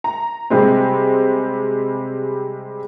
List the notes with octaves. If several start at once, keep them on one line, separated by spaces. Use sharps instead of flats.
A#5
C3 G3 G#3 C4